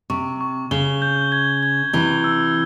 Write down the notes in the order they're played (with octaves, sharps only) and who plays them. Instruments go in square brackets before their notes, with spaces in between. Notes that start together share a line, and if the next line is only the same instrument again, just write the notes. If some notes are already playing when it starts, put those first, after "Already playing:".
[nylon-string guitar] C3 [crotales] C#6
[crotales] C#6
[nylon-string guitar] C#3 [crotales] G7
[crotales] G6
G#6
G#6
[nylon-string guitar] C3 E3 [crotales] G7
[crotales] E6